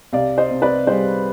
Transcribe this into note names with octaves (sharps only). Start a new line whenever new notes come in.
C2 D5 F5
C5 D#5
C3
B4 D5
G3 G#4 C5